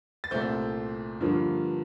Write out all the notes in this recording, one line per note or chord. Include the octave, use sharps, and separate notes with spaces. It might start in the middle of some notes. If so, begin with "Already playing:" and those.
A6
C2 A#2 A3 C4 G6
G2 D3 F3 A#3